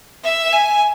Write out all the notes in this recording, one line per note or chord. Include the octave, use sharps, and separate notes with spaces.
E5
G#5